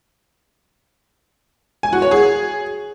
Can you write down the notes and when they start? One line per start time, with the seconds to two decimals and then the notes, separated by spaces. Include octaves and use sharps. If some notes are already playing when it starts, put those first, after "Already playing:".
1.83 G#5
1.93 F#4
2.02 C#5
2.11 G#4